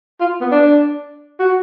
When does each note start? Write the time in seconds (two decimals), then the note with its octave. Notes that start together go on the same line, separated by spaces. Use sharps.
0.20 F4
0.41 B3
0.51 D4
1.40 F#4